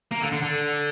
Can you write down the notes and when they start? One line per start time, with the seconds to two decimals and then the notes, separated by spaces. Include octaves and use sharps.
0.12 A#3
0.22 D3
0.32 D3
0.42 D3